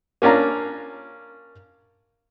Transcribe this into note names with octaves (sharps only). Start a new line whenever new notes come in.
A#3 C#4 D4 F4 A#5